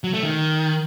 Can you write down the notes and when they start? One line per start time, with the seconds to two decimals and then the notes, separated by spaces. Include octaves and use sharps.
0.04 F#3
0.13 A3
0.23 D#3